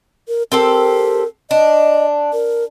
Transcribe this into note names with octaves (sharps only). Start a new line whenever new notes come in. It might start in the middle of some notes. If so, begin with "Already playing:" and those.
A#4
C4 G4 A4 A#4
D4 D#5
A#4